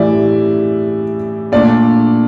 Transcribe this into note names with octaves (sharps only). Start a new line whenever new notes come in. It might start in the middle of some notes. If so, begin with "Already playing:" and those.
Already playing: A2 E3 G3 D5 E5
A#2 A3 D4 D5